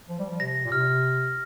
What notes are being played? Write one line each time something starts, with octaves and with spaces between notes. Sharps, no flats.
F3
G3
F3
C3 A#6
A#2
C3 F6